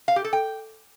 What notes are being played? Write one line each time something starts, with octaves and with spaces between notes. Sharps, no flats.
F5
G4
A4
G5